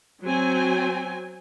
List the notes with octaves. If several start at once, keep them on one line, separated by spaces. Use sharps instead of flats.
F#3 C4 G#5